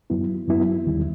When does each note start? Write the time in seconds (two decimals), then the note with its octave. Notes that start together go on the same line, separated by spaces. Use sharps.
0.10 F#2 F#3 B3 E4
0.48 F#2 F#3 B3 E4
0.87 D#2 D#3 G3